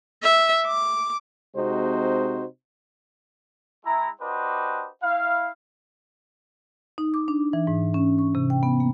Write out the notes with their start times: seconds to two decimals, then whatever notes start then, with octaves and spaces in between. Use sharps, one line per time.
0.23 E5
0.66 D6
1.56 C3 G#3 C4 D#4 F#4 C5
3.85 G#3 E4 A#5
4.21 D4 F#4 G4 B4 C5 D#5
5.03 E4 F5
6.98 D#4
7.14 D6
7.28 D4
7.53 E3
7.67 G#2
7.94 C#4
8.18 C#6
8.35 C3
8.50 G5
8.63 B3
8.80 A#3